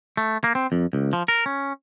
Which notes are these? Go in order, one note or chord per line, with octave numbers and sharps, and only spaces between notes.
A3
A#3
C4
F2
C#2
F3
A#4
C#4